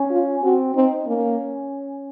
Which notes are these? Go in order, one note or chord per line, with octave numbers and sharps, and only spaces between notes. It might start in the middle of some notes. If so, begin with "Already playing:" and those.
Already playing: C#4
F4
C4 F#4
C4 D#4
A#3 C#4